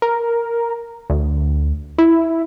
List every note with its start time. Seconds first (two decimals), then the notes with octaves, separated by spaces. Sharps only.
0.02 A#4
1.10 D2
1.98 E4